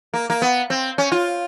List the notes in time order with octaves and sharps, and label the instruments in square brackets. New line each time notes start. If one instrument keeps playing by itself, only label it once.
[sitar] A#3
A#3
B3
C4
C#4
F4